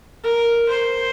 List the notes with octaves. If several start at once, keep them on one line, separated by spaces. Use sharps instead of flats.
A#4
C5